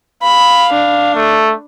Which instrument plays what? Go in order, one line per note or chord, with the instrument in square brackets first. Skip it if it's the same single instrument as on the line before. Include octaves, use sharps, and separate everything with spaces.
[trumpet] F5 [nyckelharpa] B5
[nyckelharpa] D4
[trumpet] A3